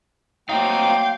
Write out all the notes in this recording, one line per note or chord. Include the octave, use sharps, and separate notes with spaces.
F#3 A3 A#3 C4 D#4 F5 G5